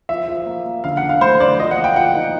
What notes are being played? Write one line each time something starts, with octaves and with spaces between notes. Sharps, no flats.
F3 E5
F3
A#3
A#3
D3 F5
F#5
D3
F5
A3 C5
D3 D5
F3 D#5
F#5
A#3
G5
F3 F#5
D#4